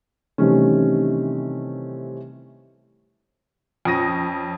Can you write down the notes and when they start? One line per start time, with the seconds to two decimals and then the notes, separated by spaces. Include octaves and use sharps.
0.38 C3 D#3 E3 G3 A3 C#4
3.85 F2 C#4 D#6 A#6 D#7